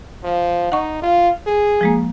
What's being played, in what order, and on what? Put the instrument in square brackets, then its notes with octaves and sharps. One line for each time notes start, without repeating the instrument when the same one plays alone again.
[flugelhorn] F3
[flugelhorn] D#4 [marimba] F#5 C#6
[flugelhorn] F4
G#4
[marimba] F3 G#3 A#3